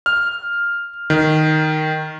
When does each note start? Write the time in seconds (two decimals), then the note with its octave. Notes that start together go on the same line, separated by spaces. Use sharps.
0.06 F6
1.10 D#3